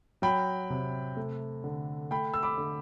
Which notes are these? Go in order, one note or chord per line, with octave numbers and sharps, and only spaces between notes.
F#3 G5 B5
C3
A3
D3
A3 G5 B5
E6
B5 D6
D3